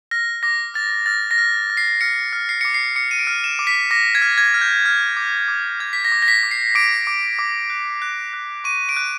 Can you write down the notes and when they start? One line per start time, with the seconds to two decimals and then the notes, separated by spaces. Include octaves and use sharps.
0.11 F6 A#6
0.43 D6 A#6
0.74 F6 A6
1.06 F6 A6
1.31 A#6
1.38 F6
1.70 F6
1.77 C7
2.01 F6 C#7
2.33 F6
2.49 C7
2.61 D6 C#7
2.74 C7
2.96 D6 C#7
3.11 D#7
3.19 D7
3.27 F6
3.44 E7
3.59 D6
3.67 B6
3.91 D6 A#6
4.15 G#6
4.22 F6
4.38 G#6
4.54 F6
4.61 G6
4.85 F6
5.17 D6
5.48 D6
5.80 F6 G#6
5.93 B6
6.05 A#6
6.12 D6
6.22 A#6
6.28 B6
6.43 D6
6.51 C7
6.75 D6 D7
7.07 D6
7.39 D6
7.70 F#6
8.02 F#6
8.33 F#6
8.64 C#6 D#7
8.89 D7
8.97 F#6